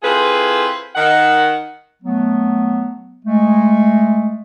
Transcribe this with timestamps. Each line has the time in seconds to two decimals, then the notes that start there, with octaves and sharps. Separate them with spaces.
0.02 C4 E4 F4 G#4 A4 B4
0.95 D#3 F#5
2.03 F#3 A3 B3
3.24 G#3 A3